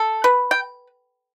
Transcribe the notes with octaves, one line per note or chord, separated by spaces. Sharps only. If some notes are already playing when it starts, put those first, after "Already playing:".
Already playing: A4
B4
G5